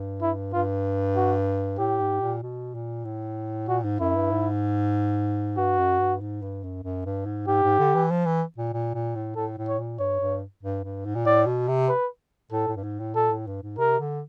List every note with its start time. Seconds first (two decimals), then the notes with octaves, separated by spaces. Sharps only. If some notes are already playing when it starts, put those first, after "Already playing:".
Already playing: G2
0.22 E4
0.53 G2 F4
1.16 F#4
1.79 A2 G4
2.00 G#2
2.21 A#2
2.43 B2
2.75 A#2
3.05 A2
3.68 A#2 F#4
3.84 G#2
4.00 F#2 E4
4.15 G2
4.32 G#2
5.57 G2 F#4
5.78 F#2
6.00 G2
6.21 G#2
6.42 G2
6.63 F#2
6.84 F#2
7.05 G2
7.26 G#2
7.47 G#2 G4
7.63 G#2
7.79 D3
7.95 E3
8.11 F3
8.26 E3
8.58 A#2
8.73 A#2
8.94 A#2
9.15 A2
9.36 A2 A4
9.58 A2
9.68 C#5
9.79 A#2
9.99 G2 C#5
10.21 G2
10.63 G2
10.84 G2
11.05 G#2
11.15 A#2
11.26 A2 D5
11.46 B2
11.68 C3
11.89 B4
12.51 A2 A4
12.68 A2
12.76 G2
12.84 G#2
13.00 A2
13.15 A#2 A4
13.30 A2
13.47 G2
13.63 G#2
13.78 C3 A#4
13.99 D3